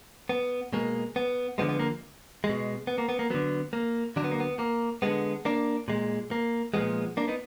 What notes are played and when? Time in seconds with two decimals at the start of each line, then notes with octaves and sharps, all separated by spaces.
0.29 B3
0.73 B2 G#3 A#3
1.16 B3
1.58 D3 F3 G#3 B3
1.69 B3
1.79 A#3
2.44 G#3
2.49 B2
2.87 B3
2.98 A#3
3.09 B3
3.19 A#3
3.30 D3 F#3 B3
3.73 A#3
4.16 D3 F#3 D4
4.24 B3
4.31 A#3
4.40 B3
4.59 A#3
5.02 D3 G#3 B3
5.45 A#3 D4
5.88 A#2 G#3
6.31 A#3
6.74 A#2 F3 G#3 B3
7.17 A#3 D4
7.28 B3 D#4